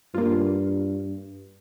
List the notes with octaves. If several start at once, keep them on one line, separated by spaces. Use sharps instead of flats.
G2 A#3 F4